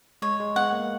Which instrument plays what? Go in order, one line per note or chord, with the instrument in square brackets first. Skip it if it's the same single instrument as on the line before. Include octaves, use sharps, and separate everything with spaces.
[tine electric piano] G#3 [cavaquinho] C#5
[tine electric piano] G#3
[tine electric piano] B3 [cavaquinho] F#5
[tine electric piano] A#3